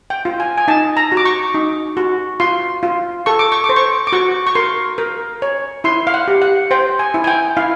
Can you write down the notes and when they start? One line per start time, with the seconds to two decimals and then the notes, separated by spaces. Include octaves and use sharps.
0.10 G5
0.25 F4
0.40 G#5
0.58 G#5
0.68 D#4 A5
0.97 A#5
1.12 F#4
1.17 D6
1.25 C#6
1.54 D#4
1.97 F#4
2.40 F4 C6
2.83 F4
3.26 A4 C#6
3.39 D6
3.52 C#6
3.64 D6
3.69 C5
3.76 C#6
4.07 D6
4.12 F#4 C#6
4.47 C#6
4.55 A#4 C6
4.98 A#4
5.42 C#5
5.84 E4 C6
6.07 F5
6.14 F#5
6.28 G4
6.42 F#5
6.71 C5 G5
6.99 G#5
7.14 E4
7.24 G#5
7.27 G5
7.57 E4 F5